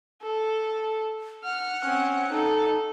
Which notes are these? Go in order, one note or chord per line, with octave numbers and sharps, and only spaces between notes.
A4
F#5 F6
C4 C#4
D#4 A4